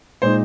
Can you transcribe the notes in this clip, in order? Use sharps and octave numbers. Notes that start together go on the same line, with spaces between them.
A#2 G#3 D#4 C5